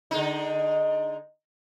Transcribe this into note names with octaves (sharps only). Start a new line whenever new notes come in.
D3 G#3 D#4